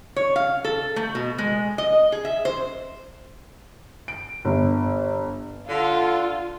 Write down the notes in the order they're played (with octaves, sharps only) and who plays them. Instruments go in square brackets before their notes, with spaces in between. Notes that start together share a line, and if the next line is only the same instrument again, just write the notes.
[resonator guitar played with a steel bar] C#5
F5
A4
A3
B2
G#3
D#5
G#4
E5
C5
[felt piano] D7
G1
[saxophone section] D3 [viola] F4